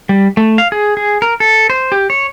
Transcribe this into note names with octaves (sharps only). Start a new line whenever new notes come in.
G3
A3
F5
G#4
G#4
A#4
A4
C5
G4
C#5